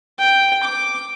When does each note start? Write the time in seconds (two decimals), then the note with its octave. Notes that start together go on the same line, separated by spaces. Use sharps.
0.19 G5
0.63 D6